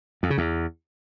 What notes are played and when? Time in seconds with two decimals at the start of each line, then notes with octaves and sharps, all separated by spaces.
0.23 F2
0.30 C#3
0.38 E2